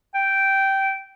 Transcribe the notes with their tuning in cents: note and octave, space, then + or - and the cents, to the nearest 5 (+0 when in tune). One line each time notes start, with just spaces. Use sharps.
G5 -10